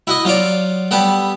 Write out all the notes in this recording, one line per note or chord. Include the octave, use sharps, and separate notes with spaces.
E4 F#4 D#5
F#3 F4 C#5 D5
G3 B3 A4 F#5